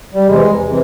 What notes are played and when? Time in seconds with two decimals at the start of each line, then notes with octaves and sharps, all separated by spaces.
0.14 G3
0.27 E2 C3 E3 G#3
0.67 C3 E3